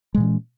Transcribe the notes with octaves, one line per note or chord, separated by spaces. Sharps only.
A#2 E3 G#3 C#4